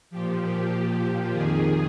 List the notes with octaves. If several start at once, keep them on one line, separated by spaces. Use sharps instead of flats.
A#2 F3 G4
G4
F2 D#3 G#4